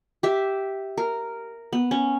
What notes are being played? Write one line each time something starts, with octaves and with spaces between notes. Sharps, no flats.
G4 E5
A#4
B3
C#4